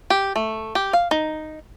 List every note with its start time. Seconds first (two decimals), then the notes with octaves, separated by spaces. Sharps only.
0.10 G4
0.36 A3
0.75 G4
0.93 F5
1.11 D#4